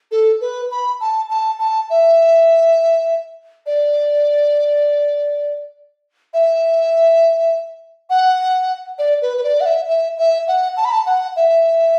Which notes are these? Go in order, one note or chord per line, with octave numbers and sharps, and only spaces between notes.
A4
B4
B5
A5
A5
A5
E5
D5
E5
F#5
D5
B4
B4
D5
F#5
E5
E5
E5
F#5
A5
B5
A5
F#5
E5